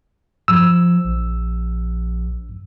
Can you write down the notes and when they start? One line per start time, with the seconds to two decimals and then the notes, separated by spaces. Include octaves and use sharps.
0.48 F3 E6
1.04 A#1